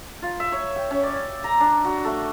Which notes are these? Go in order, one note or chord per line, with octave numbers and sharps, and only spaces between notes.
F4
E5
C#5
G5
C#4
D5
A#5
D4
F#4
A3